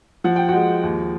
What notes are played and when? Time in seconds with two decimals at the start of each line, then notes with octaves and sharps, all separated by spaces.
0.24 F3 F#5
0.36 G5
0.48 G#3 F#4 F#5
0.83 D#2